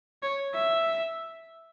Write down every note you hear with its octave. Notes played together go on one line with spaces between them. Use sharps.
C#5
E5